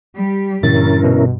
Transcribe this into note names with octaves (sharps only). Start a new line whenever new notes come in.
G3 G4
G2 A#2 D3 E3 C#4 E4 A#4 A6
B2